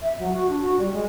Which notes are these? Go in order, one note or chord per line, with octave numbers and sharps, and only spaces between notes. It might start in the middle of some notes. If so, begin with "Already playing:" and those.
E5
F#3
F#4
D4
F#4
G3
G#3